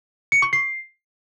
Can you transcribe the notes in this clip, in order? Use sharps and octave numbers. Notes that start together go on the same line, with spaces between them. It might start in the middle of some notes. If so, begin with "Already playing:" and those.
C#7
C#6
C7